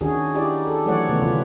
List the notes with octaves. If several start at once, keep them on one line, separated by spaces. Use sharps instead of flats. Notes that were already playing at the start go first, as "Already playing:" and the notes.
D#3 C#4 D4 F#4 G#4
D#4 E4 G4 D5
A4
E3 F#3 A3 C#5 D5 F#5
C3 D#3 E3 A3 B3 C#4
D3 D#3 F4 B4